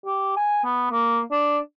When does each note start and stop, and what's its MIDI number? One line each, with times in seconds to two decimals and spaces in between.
0.06 0.33 67
0.37 0.61 80
0.64 0.91 59
0.91 1.21 58
1.31 1.59 62